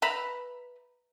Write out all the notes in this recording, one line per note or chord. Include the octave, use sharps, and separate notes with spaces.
B4 E5 A#5 B5